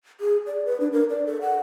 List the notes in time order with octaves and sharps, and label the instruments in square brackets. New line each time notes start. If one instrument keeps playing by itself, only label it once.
[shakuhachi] G#4
D5
B4
D4
A#4
D5
A4
F#5